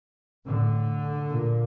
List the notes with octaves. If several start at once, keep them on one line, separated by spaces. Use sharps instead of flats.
A2 D3
A#2